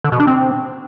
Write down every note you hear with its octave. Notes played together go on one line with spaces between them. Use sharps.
D3
B2
D4
C4